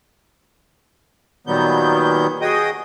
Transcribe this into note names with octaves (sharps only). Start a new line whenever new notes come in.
A#2 D#3 F#3 G3 B3 G6
F#4 G#4 D#5 G5 D#6